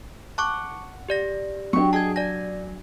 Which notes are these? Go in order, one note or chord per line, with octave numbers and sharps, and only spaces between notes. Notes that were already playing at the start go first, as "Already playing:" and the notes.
F#5 A5 C#6 D6
G4 D5 A#6
F#3 D4 G4 C#6
G#4 D#5 A5 G#6
D5 G#5 A#6